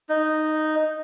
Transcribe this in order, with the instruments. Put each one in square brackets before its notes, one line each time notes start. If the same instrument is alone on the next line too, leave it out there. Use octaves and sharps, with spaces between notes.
[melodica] D#4